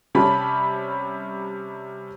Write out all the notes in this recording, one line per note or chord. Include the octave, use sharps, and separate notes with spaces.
C3 G3 C#4 A5 B5